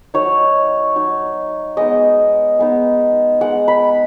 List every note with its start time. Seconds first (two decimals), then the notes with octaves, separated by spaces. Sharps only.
0.14 F#3 D#4 C#5
0.96 F#3 D#4
1.77 G#3 B3 D#4 D#5
2.59 G#3 B3 D#4
3.41 G#3 D#4 F#5
3.68 B5